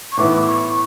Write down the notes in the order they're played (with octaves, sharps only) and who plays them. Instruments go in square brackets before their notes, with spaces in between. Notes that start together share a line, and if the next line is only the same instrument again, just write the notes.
[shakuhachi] C#6
[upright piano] A2 E3 B3 E4 [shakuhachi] D6
[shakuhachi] D6
C#6